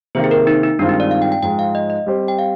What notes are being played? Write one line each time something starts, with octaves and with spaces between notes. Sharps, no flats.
C3 D#3 A#3 C5
G#4
A#4
D#4
D#4
G2 D#3 G#3 C4 D4 F4
D#4
D5
F5
G5
G5
G#2 F3 G#3 G5
F5
D#5
D#5
G3 C4 G4 C5
G5
F5